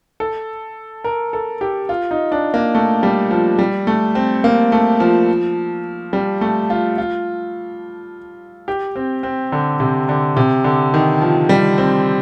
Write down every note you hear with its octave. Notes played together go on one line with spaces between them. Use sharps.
A4
A#4
A4
G4
F4
D#4
D4
A#3
A3
G3
F3
G3
A3
C4
A#3
A3
F3
G3
A3
F4
F4
G4
C4
C4
D3
C3
D3
C3
D3
D#3
F3
G3
C4